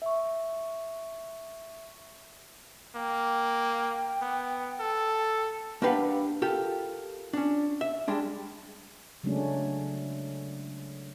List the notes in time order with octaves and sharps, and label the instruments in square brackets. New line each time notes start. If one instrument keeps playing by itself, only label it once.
[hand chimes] E5 C#6
[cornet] A#3 [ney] G5
[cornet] B3
A4
[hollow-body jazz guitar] A#3 D4 G4 B4 F5 F#5
F4 G4 A4 A#4
C#4 D4
E5
G3 G#3 D4
[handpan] C#3 F#3 G#3 A3 C#4 D4